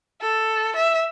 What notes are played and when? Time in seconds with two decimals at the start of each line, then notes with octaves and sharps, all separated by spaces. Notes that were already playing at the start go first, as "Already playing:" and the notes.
0.21 A4
0.76 E5